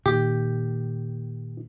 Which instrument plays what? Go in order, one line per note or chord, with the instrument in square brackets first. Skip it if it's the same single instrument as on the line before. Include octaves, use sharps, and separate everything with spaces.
[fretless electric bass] A#2 D#3 [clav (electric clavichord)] G4